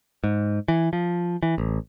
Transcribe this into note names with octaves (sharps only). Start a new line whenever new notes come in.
G#2
E3
F3
E3
A1